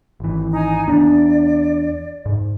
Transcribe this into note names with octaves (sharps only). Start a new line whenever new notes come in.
G#1 E3
D#4 G#5 A#5
E2 B3 D4 D5
G#2